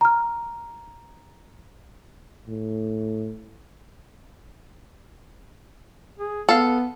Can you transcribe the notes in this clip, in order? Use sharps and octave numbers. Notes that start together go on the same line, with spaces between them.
A#5 F6
A2
G#4
B3 A4 F5